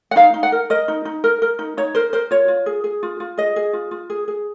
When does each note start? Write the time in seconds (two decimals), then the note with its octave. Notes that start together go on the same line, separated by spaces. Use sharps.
0.11 F#5
0.16 D#4 F5
0.34 D#4
0.43 F#5
0.52 A#4
0.70 A#4 D#5
0.88 D#4
1.05 D#4
1.24 A#4
1.42 A#4
1.59 D#4
1.77 D#4 C#5
1.95 A#4 C5
2.13 A#4 C5
2.31 F4 C#5
2.48 F4
2.66 G#4
2.84 G#4
3.03 F4
3.20 F4
3.38 G#4 D#5
3.56 G#4
3.73 F4
3.91 F4
4.10 G#4
4.28 G#4